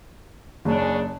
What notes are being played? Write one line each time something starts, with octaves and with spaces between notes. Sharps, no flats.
F#1 C#3 C#4 D4 G#4